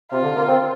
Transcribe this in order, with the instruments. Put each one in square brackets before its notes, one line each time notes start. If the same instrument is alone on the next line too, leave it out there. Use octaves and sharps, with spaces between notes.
[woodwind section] C3 [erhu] F4
[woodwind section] D3
A#3
C4